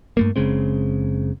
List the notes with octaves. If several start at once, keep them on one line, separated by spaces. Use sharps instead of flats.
G2 A3 A#3
F#1 C#3 G#3 C4